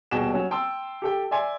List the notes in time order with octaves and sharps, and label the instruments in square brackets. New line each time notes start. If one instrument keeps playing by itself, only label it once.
[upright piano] D#1 B2 G#4 G5 E7
F#3 C#4
G5 A5 C6 D#6 E6
G4 A4 G5
D5 E5 G#5 C6